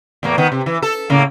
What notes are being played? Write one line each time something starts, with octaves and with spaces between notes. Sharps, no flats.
E2 A2 A#3
D#3 B3
C3
E3
A4
A2 C#3 A#3